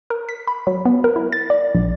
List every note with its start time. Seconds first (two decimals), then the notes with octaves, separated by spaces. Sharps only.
0.10 A#4
0.29 B6
0.47 B5
0.67 F#3
0.85 B3
1.04 A#4
1.16 E4
1.32 A6
1.50 D5
1.75 A#1